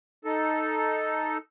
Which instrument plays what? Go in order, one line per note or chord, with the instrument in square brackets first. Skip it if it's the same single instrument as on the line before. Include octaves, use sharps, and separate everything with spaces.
[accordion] D#4 A4